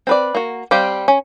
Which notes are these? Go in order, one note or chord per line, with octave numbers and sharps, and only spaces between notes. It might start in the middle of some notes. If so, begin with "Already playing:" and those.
C4 B4 D5
A#3 F#4
G3 C4 G4 F5
C#4